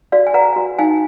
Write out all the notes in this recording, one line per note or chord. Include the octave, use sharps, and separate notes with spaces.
F#4 D5 F5
G#5
B4 F#5 A#5
F#4
D#4 F5 G#5